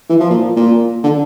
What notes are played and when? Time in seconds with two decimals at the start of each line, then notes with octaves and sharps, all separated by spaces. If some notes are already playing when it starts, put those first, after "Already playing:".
0.09 E3
0.20 F3
0.30 A#2
0.56 A#2
1.04 D3